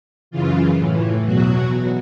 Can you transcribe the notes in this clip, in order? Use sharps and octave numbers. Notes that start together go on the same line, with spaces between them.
F#2 C#3 E3 F4
A2 E3
E2 B2 F#3 F#4